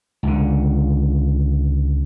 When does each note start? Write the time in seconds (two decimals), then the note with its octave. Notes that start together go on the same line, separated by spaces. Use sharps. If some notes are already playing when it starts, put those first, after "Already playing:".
0.23 C#2 D3